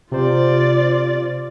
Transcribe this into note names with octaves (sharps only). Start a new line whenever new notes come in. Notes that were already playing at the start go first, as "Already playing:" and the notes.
C3 F4 C5 D5